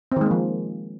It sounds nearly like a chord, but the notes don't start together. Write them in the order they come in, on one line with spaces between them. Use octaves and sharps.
C4 D#3 G#3 A#3 F3